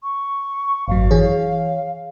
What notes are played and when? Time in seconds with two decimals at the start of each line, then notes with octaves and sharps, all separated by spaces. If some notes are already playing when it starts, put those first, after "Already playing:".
0.03 C#6
0.88 G#1 F#2 F#3 F5
1.11 E3 G#4 C#5